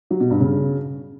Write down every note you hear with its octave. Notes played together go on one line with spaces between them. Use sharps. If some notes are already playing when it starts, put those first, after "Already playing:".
F#3
B2
G2
C#3